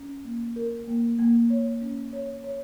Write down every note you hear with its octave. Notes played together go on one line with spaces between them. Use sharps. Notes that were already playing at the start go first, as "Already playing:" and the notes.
Already playing: C#4
A#3
A#4
A#3
A#3
C#5
C#4
C#5
C#5